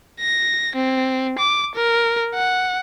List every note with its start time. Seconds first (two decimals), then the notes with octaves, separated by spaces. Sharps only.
0.20 A#6
0.76 C4
1.38 D6
1.75 A#4
2.34 F#5